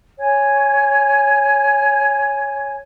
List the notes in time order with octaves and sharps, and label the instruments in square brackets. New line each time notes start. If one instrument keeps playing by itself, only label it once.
[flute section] C#5 G#5